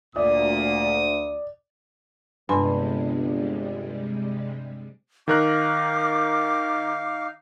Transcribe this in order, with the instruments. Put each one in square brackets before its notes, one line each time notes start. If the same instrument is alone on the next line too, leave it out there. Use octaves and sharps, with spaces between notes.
[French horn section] D2 [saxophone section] A#2 [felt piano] D5 [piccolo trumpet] D#6
[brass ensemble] G1 [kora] G2 [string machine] C3 G3 G#3 [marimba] G#5 B5 C6
[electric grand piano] D#3 A#4 F#6 [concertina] D#4 F5 [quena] D6